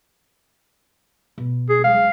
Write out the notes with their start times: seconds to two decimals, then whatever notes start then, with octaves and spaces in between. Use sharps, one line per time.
1.38 B2
1.69 G#4
1.84 C#2 F#3 F5